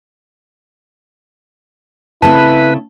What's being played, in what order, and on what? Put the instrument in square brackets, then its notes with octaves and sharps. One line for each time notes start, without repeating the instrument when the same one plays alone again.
[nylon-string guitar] C#3 A3 C4 [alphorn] E4 [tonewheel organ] B4 [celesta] A5